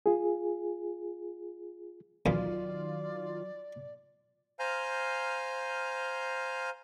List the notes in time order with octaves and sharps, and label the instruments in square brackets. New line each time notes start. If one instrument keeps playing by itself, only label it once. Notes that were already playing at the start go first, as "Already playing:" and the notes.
[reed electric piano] F4 G#4
[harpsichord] D2 E3 [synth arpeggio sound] D#3 F4 [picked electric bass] F#3 [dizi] D5
[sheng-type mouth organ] C5 F5 G#5 A#5 F6 G6